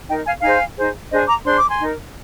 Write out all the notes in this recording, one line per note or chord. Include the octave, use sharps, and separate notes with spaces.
D#4 A#4 D#5 G5
F5 G#5
D#4 G#4 C5 F5 G#5
D#4 G#4 C5
D4 G#4 C5 D#5
A#5 D6
D4 G#4 C5 C6
D6
G#5 C6
D#4 A#4